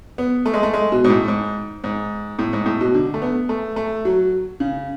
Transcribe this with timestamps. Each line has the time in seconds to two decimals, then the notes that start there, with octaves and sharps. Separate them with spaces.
0.18 B3
0.46 A3
0.54 G#3
0.63 A3
0.74 G#3
0.92 B2
1.04 G#2
1.10 A2
1.28 G#2
1.84 G#2
2.39 A2
2.53 G#2
2.66 A2
2.81 B2
2.94 D3
3.14 A3
3.22 B3
3.49 A3
3.76 A3
4.05 F#3
4.60 C#3